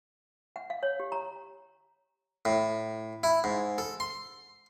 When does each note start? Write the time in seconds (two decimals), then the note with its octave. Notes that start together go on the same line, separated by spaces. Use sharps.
0.56 F#5
0.70 F5
0.83 C#5
1.00 G4
1.12 A#5
2.45 A2
3.23 E4
3.44 G#2
3.78 A4
4.00 C6